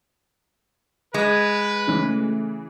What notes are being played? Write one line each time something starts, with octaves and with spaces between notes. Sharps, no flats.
G#3 B4
C#3 E3 A3